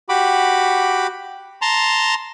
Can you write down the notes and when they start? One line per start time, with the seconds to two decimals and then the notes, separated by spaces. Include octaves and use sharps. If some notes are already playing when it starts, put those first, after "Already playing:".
0.09 F#4 G4 B5 D6
1.62 A5 A#5 C6